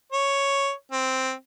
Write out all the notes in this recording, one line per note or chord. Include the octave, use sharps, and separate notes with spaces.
C#5
C4